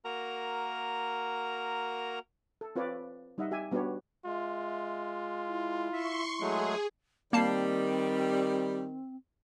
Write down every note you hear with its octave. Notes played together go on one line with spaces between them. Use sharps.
A#3 F#4 A#4 A#5
A4
C4 F4 B4 C#5 D5
G3 D#4 D#5 E5 F#5
G4 E5 G#5
G3 B3 D4 F#4 G4 C#5
G#3 F4 E5
E4
E5 C6 C#6
F#3 G#3 A3 G#4
D#3 G3 A#3 C4 A5 C7